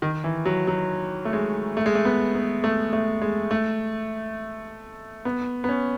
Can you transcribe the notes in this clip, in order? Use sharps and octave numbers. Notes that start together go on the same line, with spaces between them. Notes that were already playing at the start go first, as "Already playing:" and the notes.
D#3
E3
F#3
F#3
A3
G#3
A3
G#3
A3
B3
B3
A3
A3
G#3
A3
B3
B3
C#4